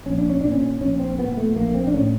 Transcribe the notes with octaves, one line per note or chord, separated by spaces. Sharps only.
A#1 C#4
D4
C#4
A#2 D4
C#4
A#1 C#4
C4
A#2 B3
A3
A#1 A#3
C4
D4
A2 C#4